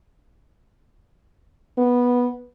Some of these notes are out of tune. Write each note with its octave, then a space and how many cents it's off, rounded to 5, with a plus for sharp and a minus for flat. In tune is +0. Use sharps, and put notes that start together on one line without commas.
B3 -10